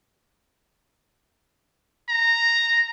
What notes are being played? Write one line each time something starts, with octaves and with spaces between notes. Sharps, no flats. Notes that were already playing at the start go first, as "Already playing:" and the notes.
A#5